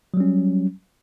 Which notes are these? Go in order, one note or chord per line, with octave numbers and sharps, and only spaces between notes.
F#3 G3 C#4